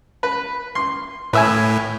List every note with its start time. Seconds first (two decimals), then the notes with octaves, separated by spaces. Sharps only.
0.23 B4
0.75 C6
1.33 A2 B4 E5 G#5